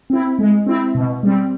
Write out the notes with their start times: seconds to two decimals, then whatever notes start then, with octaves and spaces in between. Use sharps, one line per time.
0.10 C4 E4
0.39 G#3
0.66 C4 E4
0.95 B2
1.23 G3 C4